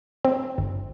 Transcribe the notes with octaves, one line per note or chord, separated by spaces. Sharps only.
C4
G1